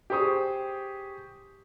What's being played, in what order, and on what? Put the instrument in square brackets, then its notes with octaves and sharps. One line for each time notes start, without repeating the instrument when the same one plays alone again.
[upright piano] G4 G#4 C5 C#6 D#6